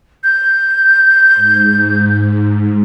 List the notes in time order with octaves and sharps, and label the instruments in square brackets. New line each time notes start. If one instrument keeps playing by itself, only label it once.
[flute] G6
[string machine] G#2